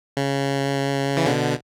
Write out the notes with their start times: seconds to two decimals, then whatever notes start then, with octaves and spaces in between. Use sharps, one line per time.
0.17 C#3
1.17 E3
1.26 B2 D3